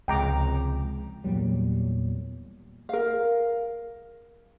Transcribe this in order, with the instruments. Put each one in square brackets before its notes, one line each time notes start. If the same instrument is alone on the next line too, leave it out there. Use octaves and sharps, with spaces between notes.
[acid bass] C#2 [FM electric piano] C3 F3 G#3 [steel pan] G5 A#5 D6
[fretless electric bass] E2 A#2 F#3 G3
[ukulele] A#4 F5